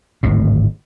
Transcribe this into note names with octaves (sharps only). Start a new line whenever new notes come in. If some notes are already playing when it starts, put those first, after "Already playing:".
D1 G#1 A2